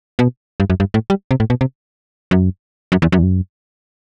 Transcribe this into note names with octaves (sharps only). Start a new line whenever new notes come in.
B2
G2
F#2
G2
A2
G3
C3
A2
B2
C3
F#2
F#2
E2
F#2
E2
F#2